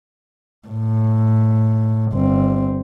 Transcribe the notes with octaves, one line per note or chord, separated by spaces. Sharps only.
A2
G1 C4